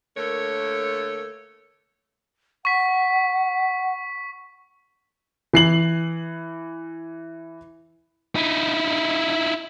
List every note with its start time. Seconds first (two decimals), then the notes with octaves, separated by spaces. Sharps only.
0.17 D3 A3 A#3 A4 A#4 C#5
2.65 F#5 C#6 B6
5.53 E3 C7 F#7
8.35 D#4 E4